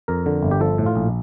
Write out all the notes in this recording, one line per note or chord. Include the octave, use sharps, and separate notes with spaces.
F2 A#4
D3
G1
G4
F3 A4
A2
F4
A#1